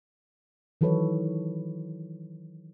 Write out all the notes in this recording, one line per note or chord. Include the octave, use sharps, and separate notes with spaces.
D#3 E3 F#3 A4 B4 C#5